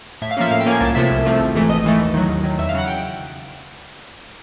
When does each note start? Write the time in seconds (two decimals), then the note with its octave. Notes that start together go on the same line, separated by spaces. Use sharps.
0.21 A2 E5
0.31 F5
0.37 F3 A#3 C#4 E5
0.51 A2 F5
0.61 G5
0.66 F3 A#3 C#4 G#5
0.81 C2 A5
0.95 C3 F3 A3 E5
1.11 C2
1.25 C3 F3 A3
1.40 G#1
1.55 G#2 E3 A3
1.70 G#1 D#5
1.84 G#2 E3 A3
2.00 D#2
2.14 D#3 F#3
2.29 D#2
2.44 D#3 F#3
2.58 E2 E5
2.69 F5
2.74 C#3 F#3 F#5
2.88 G5